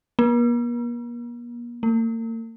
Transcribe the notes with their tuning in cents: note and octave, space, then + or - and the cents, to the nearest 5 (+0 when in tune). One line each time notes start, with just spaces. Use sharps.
A#3 +45
A#3 -45